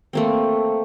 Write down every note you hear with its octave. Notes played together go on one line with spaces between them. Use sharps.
A3 A#3 C4